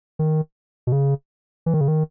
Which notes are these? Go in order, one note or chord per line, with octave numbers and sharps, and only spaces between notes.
D#3
B2
C#3
E3
D#3
C#3
D#3